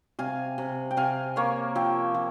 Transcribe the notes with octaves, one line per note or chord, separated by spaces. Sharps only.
C3 F5 G#5
C3
G5
C3 F5 G#5
A#3 C#5 F5
F3 E5 G5
F3